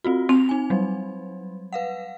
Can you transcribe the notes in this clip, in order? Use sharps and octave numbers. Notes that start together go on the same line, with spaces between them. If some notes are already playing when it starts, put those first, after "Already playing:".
C4 F4 F#4
C4 F7
D#4 G#5
F#3 G3
B4 F5 F#5